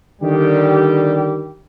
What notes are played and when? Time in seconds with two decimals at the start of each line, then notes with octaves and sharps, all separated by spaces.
0.22 D3 D#3 G3 G4